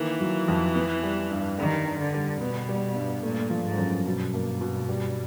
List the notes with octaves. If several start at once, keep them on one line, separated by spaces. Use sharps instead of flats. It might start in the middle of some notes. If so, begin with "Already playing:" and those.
Already playing: D#3 E3 A#3
F#3
F2
B3
G3
G2
D#3 G3
D4
D3
G3
B2 B3
G3
G2
A#2 A3
F3
G#2
F#2
G2 B2
A#3
B2
G3